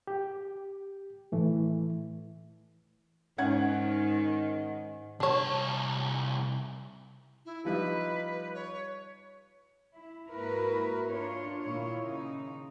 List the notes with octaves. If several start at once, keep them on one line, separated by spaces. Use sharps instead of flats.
G4
A2 E3 A3
G#2 D#3 C#4 F#5 G#6
C2 D4 C#5 A5
E4
F3 G3 D#4 B4
C#5
E4
G#2 A#3 E4 F#4 A#4 B4
D4 F4 C#5
A#2 D#3 A#3 E4 F4 C#5
C#3 D#4